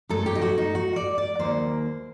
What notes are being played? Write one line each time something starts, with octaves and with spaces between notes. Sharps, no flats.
F#2 F#3 A3 A4
G4
D#4
F#4
D#4
F#4
D5
D5
D#2 D#3 F#3 A#3 C5